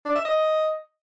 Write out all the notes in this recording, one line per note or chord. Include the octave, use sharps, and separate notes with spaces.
D4
E5
D#5